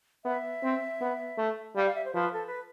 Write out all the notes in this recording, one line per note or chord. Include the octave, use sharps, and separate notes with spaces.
B3 E5
C4
B3
A3
G3 F5
F5
E5
C5
F3 B4
A4
B4